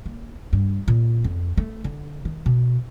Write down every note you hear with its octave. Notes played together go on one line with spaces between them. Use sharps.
A#3
G2
A#2
F2
A3
D3
D#3
B2